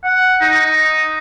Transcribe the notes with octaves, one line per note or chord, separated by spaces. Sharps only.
F#5
D#4